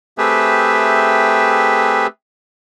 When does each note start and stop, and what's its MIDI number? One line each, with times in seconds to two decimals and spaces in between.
0.18 2.07 57
0.18 2.07 60
0.18 2.07 67
0.18 2.07 68
0.18 2.07 71
0.18 2.07 76